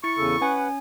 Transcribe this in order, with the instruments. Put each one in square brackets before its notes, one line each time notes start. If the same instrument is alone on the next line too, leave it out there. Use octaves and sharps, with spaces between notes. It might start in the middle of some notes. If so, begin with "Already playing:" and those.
[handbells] E4 A6 C#7 [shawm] C#6
[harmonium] E2 C#3 A4
[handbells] C#4 G#5 [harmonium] B4 F#5